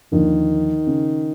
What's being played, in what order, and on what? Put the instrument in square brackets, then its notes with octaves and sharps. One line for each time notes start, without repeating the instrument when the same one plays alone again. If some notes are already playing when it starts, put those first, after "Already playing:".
[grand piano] D#2 D3 F3 A#3 D4 [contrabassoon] D#3
[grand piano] C#3